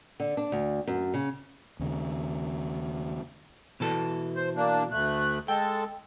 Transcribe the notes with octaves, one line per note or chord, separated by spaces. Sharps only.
D3
D4
D2
F#2
C#3
D#2 C#3
B2 E3 A4
C5
A#3 D4
D2 A3 F#6
G#3 A4 G5